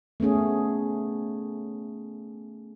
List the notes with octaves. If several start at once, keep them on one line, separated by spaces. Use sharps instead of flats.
A3 B3 C#4 G#4